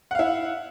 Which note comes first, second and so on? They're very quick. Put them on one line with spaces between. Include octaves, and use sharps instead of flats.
F#5 F5 E4